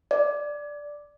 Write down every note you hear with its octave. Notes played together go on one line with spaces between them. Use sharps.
D5